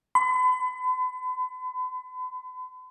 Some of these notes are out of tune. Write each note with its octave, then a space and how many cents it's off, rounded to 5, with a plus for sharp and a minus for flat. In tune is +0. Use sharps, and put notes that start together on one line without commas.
B5 +40